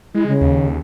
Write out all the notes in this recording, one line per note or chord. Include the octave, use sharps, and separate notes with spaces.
G#3 E4
C#3
D#2